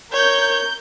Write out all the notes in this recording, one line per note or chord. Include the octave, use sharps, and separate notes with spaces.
A#4 C#5 G6